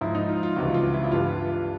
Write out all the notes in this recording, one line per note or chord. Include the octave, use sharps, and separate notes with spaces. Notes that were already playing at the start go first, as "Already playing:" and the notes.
G#2 F3 E4
D#4
F4
F4
C#2 C3 E3 G3 F#4
F4
E4
E4
G2 E3 G3 F4